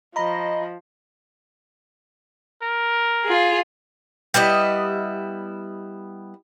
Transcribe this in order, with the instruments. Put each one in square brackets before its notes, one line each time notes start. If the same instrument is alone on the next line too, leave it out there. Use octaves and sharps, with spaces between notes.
[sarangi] F3 [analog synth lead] D#5 [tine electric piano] A#5 B5
[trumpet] A#4
[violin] F4 G#4
[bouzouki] G3 B3 E4 D#5